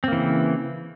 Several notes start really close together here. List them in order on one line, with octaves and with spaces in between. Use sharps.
C4 A#3 E3 C#3